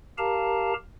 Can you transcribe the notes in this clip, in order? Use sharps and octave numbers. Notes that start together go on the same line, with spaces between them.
G4 A#4 F5 A5 A#5